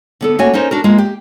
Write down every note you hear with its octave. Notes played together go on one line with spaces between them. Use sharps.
D3 B3 A4
A3 A#3 C#4 F#4 C#5 G#5
C#4 D#4 A#4 C5
D4 F#4 A#4
G#3 A#3 F4
G4